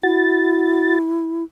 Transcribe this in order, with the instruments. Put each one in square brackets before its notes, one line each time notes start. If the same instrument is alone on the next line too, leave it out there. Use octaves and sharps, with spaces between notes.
[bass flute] E4 [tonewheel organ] F#4 A6